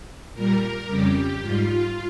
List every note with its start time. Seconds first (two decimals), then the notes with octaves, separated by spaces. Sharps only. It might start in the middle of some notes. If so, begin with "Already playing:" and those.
0.34 A#2 G3 A#4
0.87 F2 C#3 G3 G4
1.40 G#2 G3 F4